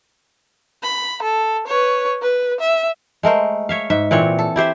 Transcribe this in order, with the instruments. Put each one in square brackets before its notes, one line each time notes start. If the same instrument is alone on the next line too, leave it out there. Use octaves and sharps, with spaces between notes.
[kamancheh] B5
A4
B4 C#5
B4
E5
[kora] G#3 A3 A#4 C5
C#5 E5 F5
G#2 E5
A#2 E3 C4 C#5
A4
E4 G4 C5 E5